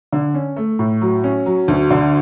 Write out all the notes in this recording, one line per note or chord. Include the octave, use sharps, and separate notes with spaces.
D3
C#4
A3
A2
F#3
C#4
F#3
D2
D3